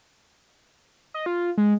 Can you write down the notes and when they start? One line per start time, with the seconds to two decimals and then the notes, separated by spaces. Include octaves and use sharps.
1.14 D#5
1.26 F4
1.57 G#3